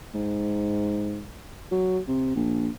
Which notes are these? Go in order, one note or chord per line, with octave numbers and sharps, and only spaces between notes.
G#2
F#3
C3
A#1